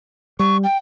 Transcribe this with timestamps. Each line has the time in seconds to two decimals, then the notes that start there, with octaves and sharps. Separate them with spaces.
0.39 G3 C#6
0.64 G5